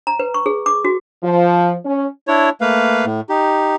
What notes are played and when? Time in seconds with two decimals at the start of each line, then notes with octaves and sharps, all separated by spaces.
0.07 A#5
0.19 B4
0.34 C#6
0.46 G#4
0.66 D6
0.85 F#4
1.23 F3
1.84 C#4
2.27 D4 E4 C#5
2.61 A3 A#3 B4 F5
3.05 A2
3.29 D#4 G4